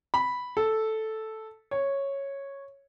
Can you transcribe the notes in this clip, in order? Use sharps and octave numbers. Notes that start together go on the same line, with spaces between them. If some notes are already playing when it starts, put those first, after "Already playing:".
B5
A4
C#5